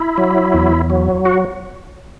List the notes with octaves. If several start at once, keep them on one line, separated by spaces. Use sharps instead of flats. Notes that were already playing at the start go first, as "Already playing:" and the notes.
Already playing: E4
F#3
E2
F#3
F#4